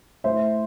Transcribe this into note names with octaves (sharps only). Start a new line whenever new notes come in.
A2 C5 E5